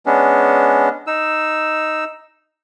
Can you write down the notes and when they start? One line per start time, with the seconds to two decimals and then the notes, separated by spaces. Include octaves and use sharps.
0.06 G#3 B3 C#4 D4
1.07 D#4 E6